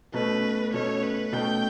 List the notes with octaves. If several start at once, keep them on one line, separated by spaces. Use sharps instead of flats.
B2 A3 C#4 B4
B2 A3 C#4 C#5
B4
B2 A3 C#4 G5